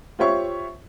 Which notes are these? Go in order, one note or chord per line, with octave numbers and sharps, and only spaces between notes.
F4 G4 C5 C#5 E5 C#6